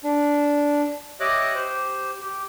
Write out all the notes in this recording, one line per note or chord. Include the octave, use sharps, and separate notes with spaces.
D4
G4 C#5 D#5 E5 D6 F#6
G4 C5
G4